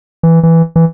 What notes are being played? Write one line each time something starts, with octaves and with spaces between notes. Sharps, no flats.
E3
E3
E3